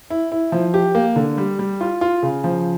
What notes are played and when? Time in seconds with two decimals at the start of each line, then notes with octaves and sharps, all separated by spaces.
0.10 E4
0.32 E4
0.52 F3
0.74 G4
0.95 A#3
1.16 D3
1.38 G3
1.59 G3
1.81 F4
2.01 F4
2.22 C#3
2.44 F3